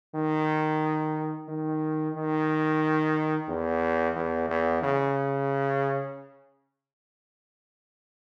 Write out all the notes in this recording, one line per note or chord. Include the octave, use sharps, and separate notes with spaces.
D#3
D#3
D#3
E2
E2
E2
C#3